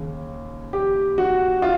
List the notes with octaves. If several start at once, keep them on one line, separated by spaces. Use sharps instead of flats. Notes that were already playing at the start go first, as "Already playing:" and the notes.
Already playing: D#2 C#3
G4
F#4
F4